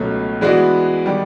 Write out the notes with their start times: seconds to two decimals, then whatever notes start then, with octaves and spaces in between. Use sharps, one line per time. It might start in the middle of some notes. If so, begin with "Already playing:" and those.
Already playing: C#2 B2 F#3 A3
0.41 E3 G#3 B3 D4 F#4
1.06 D#3 G3